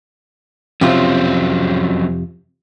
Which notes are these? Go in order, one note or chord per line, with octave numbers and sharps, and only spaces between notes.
F2 C3 F#3 C4 C#4 F4